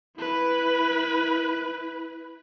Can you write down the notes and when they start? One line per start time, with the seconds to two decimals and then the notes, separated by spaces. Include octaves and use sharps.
0.17 E4 B4